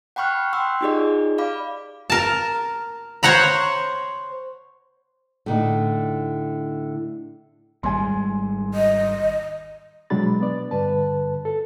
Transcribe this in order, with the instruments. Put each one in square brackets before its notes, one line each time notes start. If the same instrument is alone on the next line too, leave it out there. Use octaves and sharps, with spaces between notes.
[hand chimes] F#5 G5 B5 C#6 F6 F#6
F#5 G5 C6 E6
D#4 F4 G4 G#4 D5 D#5
D5 F5 B5 D6
[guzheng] A#4 A5
C5 C#5 F#5 A#5 B5
[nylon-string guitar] A2 D3 D#4
[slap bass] G#1 G3 G#3 [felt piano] G#5 C6
[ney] D#5
[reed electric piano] B2 F#3 G#3 D4 B5 A6
B3 D5
G2 D3 B4 A5
A4